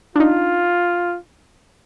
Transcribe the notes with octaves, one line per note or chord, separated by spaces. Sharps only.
D4 D#4 F4